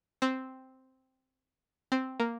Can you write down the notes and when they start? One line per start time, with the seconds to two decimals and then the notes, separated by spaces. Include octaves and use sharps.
0.22 C4
1.92 C4
2.20 A#3